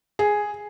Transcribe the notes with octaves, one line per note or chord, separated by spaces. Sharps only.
G#4